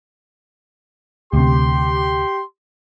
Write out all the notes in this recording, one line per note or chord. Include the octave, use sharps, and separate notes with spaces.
D2 C3 G4 C6